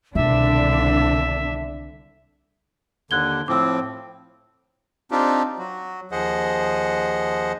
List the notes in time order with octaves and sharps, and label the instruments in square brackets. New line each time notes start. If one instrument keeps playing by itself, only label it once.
[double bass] C2 D3 [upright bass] B2 D#3 [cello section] D4 [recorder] E5
[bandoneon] D#2 D3 [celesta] F#6 G#6 G7
[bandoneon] A2 F3 C4 [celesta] D6 E6
[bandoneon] C4 D4 D#4 F4 G4
F#3 F#4
D#2 F3 G#4 C5 D#5 F#5